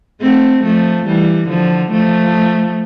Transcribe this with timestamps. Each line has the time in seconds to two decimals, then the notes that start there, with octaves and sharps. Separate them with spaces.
0.21 A3 C4
0.64 F3 A3
1.06 E3 G3
1.48 D3 F3
1.91 F3 A3